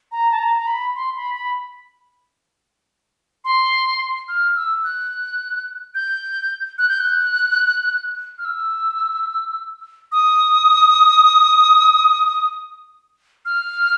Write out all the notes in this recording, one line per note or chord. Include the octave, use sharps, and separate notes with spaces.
A#5
A5
A#5
A#5
B5
C6
B5
B5
C6
F6
E6
F#6
G6
F#6
G6
F#6
F6
E6
D#6
F6